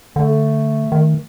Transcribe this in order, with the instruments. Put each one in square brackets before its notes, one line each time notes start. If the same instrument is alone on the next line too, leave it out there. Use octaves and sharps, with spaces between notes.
[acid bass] D3 [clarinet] A3
[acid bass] D#3